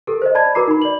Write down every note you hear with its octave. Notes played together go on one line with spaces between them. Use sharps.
G4 A4 A#4
C5 D#5
D5 A5 B5 G#6
F#4 A#4 B4 A#5 D6 C7
D#4 B5
D5 F#7